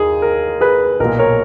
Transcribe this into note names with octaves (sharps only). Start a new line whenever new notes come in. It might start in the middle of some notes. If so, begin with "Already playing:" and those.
Already playing: D#2 D#3 G#4
A#4
G#4 B4
B1 A#2 A#4
A#4 C#5